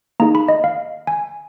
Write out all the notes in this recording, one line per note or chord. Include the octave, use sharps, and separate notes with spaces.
A#3 D#4 G#4 A#5
B5
D#5
F5
G#5